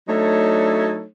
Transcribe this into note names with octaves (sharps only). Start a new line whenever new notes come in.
F#3 A3 D4 D#4 A4 C#5